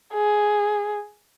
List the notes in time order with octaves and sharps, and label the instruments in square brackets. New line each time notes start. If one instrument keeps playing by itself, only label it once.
[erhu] G#4